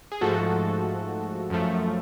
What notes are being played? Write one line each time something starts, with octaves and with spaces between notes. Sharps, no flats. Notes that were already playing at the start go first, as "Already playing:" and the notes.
G#4
G#2 F3 A3 F#4 A4
F#2 F3 A3